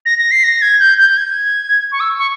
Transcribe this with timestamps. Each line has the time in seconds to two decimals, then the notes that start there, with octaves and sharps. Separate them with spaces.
0.06 A#6
0.18 A#6
0.31 C7
0.44 A#6
0.62 G#6
0.80 G6
0.98 G6
1.17 G#6
1.92 C#6
2.00 E6
2.19 C#6